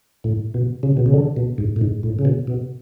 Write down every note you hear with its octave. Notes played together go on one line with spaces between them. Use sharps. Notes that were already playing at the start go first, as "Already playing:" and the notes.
A2
B2
C#3
B2
C#3
D3
B2
G#2
A2
G#2
A2
C#3
B2
B2